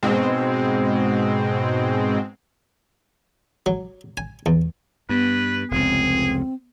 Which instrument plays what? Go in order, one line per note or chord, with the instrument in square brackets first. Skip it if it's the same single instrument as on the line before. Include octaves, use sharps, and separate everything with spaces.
[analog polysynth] G#2 B2 G#3 C4
[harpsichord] F#3
G#5
E2
[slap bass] G2 [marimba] B3 [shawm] B4
[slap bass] F1 C#2 [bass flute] C4 [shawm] G#4